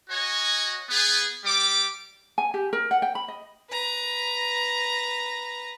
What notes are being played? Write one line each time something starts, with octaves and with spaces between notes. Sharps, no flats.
F#4 C#5 D#5 G#5
B3 G#4
G3 G4 D6
G#5
G4
A#4
F#5
G5
B5
D#5
B4 A#5